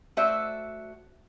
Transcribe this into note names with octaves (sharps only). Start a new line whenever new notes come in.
A3 F#4 C5 D5 E5